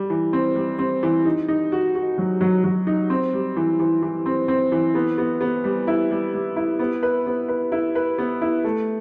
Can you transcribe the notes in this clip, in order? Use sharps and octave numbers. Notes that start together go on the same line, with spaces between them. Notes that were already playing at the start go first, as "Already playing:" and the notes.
Already playing: G3
E3
C4
G3
C4
E3
D#4
D#4
F#4
F#4
F#3
F#3
F#3
D#4
C4
G3
E3
E3
E3
C4
C4
E3
B3
B3
B3
G3
E4
G3
G3
E4
B3
B4
B3
B4
E4
B4
B3
E4
A3